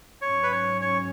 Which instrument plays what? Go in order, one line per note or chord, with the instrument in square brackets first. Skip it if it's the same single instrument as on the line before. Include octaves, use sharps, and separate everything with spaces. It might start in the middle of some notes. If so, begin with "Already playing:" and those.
[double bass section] G#2 F#3 C#4 [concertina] C#5
[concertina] B4
C#5
C#5